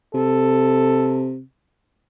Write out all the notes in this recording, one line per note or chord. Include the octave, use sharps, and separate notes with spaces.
C3 A4